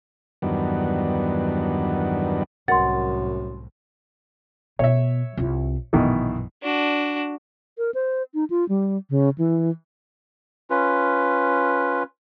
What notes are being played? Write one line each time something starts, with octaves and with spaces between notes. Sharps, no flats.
E2 G2 D#3 F#3 B3 D4
C2 F#2 A2 A#4 D#5 F#5 C6 A6
B2 C#5 E5
C2 F4
A#1 F#2 B2 D#3 E3
D4 F#4
A#4
C5
D#4
F4
G3
C#3
E3
C#4 F4 B4